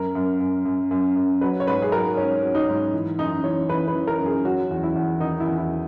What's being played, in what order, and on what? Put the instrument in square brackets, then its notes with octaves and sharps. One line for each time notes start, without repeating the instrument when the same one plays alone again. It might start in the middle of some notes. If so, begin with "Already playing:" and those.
Already playing: [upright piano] F#2 A#4
F#2
F#2
F#2
F#2
F#2
F#3 B4
C#5
G#2 B4
G#4
F#3 A#4
G#2 C#4
F#3
D#4
G#2
E3
F#2 D#4
E3 C#5
E3 B4
B4
E3
A#4
F#2
G#4
F#3 F#4
E2
E4
E2
D#3 D#4
E4
E2
E4